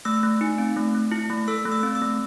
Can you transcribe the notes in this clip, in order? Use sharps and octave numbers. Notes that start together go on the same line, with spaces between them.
A3 E6
A3
D#4
C4
A3
A3
E4
A3
A4 E6
A3
E6
C4
E6
A3